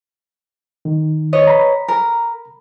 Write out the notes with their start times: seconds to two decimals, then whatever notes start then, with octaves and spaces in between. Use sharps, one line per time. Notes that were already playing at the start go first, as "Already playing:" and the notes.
0.85 D#3
1.33 B4 C#5 D#5
1.47 A#5 B5
1.88 A#4